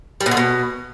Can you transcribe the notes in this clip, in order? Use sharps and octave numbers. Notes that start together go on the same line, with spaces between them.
G3
B2
D3
B2